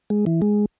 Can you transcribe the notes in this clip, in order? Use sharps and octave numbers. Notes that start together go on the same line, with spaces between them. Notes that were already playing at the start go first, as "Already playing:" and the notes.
G#3
E3
G#3